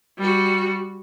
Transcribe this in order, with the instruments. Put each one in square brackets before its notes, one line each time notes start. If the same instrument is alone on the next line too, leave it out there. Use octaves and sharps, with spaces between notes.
[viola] G3 F#4